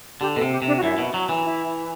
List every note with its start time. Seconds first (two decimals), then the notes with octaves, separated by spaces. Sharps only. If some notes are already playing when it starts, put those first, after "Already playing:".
0.21 D3 G4
0.36 B2 A4
0.41 C3
0.52 G4
0.62 C3
0.67 D4
0.78 F#4
0.83 F#2 E4
0.98 B2
1.14 F#3
1.29 E3
1.44 E4